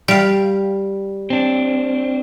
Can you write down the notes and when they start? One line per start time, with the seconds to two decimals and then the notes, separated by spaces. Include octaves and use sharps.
0.08 G3 F5
1.30 C4 D4